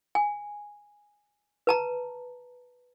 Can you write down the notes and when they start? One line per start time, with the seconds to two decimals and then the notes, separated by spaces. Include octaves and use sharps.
0.15 G#5
1.67 B4 A5 A#5